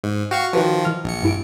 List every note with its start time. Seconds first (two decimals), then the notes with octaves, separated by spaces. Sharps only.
0.04 G#2
0.31 F#4 F5 G5 C#6
0.53 D#3 F3 F#4 B4 C#5
0.85 E3 F6
1.04 A#1 C#7
1.23 G2 E4 D7